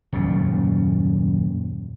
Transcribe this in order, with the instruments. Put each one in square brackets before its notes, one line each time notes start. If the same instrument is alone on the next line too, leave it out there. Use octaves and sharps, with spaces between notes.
[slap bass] D#1 F#2 A#2 C#3